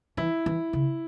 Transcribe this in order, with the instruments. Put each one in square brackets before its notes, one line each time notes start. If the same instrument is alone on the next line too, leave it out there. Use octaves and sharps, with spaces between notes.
[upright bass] E3 [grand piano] E4
[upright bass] E3
C#3